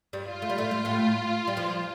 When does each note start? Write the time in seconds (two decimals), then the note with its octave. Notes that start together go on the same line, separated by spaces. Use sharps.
0.13 G2 G3
0.27 F4
0.42 A3
0.50 G3
0.58 A2 A3
0.71 A3
0.85 A2 A3
1.47 G3
1.57 F2 F3